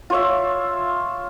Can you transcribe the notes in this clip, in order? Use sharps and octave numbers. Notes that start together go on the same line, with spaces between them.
F4 C#5 E5